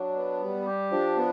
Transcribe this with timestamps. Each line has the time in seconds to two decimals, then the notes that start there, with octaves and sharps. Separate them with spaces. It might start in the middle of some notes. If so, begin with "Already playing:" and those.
Already playing: F#3 D4
0.15 B3
0.41 G3
0.66 G4
0.92 F3 D4
1.17 B3